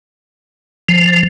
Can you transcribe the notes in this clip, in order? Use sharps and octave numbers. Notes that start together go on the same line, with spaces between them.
F3